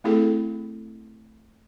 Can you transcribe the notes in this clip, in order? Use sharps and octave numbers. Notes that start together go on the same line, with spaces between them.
A3 C4 E4 G#4 A4